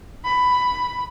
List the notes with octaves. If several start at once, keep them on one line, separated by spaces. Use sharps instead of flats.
B5